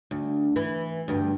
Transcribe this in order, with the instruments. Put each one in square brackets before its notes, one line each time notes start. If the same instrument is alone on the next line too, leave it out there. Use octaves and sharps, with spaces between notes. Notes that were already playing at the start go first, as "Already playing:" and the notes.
[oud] D2
E3
D2 G2